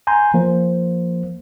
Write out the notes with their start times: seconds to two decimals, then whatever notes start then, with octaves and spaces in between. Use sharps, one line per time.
0.07 G#5 A#5 C6 G6
0.34 F3 A#3 C5